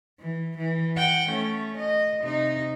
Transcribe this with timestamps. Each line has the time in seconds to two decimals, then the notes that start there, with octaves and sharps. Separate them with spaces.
0.20 E3
0.58 E3
0.97 F#5 G5
1.30 A3 C#4
1.78 D#5
2.22 C3 D#4